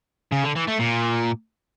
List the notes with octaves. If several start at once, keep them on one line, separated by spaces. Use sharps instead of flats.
C#3
D3
E3
A3
A#2